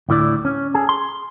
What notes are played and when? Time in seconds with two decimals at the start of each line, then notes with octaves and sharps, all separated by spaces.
0.09 D2 A2 E4 D5
0.45 C#4
0.74 G#4 A4
0.89 C6